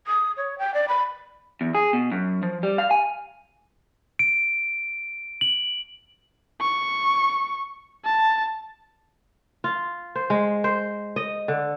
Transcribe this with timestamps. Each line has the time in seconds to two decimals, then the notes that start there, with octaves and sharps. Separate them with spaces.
0.07 D#6
0.37 C#5
0.59 G5
0.74 D5
0.88 B5
1.61 E2
1.75 G#4
1.93 B2
2.12 F#2
2.43 F3
2.63 G3
2.78 F5
2.91 G#5
4.19 D7
5.41 F#7
6.61 C#6
8.05 A5
9.64 F4
10.15 C5
10.30 G#3
10.64 C5
11.16 D#5
11.48 D3